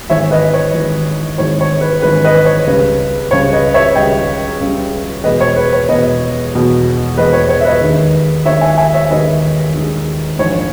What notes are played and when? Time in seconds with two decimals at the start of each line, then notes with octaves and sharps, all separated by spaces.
0.10 G#1 G#2 E3 C#5 E5
0.31 B4 D#5
0.54 C#5
0.74 G#1 G#2 E3
1.38 G#1 G#2 E3 C#5
1.61 C#5
1.81 B4
2.02 G#1 G#2 E3 B4
2.25 B4 D#5
2.45 C#5
2.67 C#2 C#3 G3 B4
3.31 C#2 C#3 G3 C#5
3.53 B4 D#5
3.74 C#5 E5
3.96 C#2 C#3 G3 D#5 G5
4.61 C#2 C#3 G3
5.24 E2 B2 G#3 B4 D#5
5.41 C#5
5.56 B4
5.73 C#5
5.89 E2 B2 G#3 B4 D#5
6.53 E2 B2 G#3
7.17 E2 B2 G#3 B4 D#5
7.33 C#5
7.49 C#5
7.61 E5
7.65 B4 D#5
7.81 D#2 D#3 G#3
8.45 D#2 D#3 G#3 C#5 E5
8.61 E5 G#5
8.78 E5 G#5
8.94 C#5 E5
9.10 D#2 D#3 G#3 B4 D#5
9.74 D#2 D#3 G#3
10.38 A#1 G#2 E3 C#5